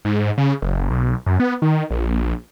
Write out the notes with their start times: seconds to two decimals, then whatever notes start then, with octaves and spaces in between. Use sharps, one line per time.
0.05 G#2
0.38 C#3
0.62 F#1
0.90 B1
1.26 F#2
1.40 B3
1.62 D#3
1.91 A#1